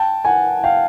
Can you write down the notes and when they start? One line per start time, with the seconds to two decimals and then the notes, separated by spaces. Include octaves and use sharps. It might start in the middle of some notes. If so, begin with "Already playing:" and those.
Already playing: G5 A5
0.25 F#5 G#5
0.64 F5 G5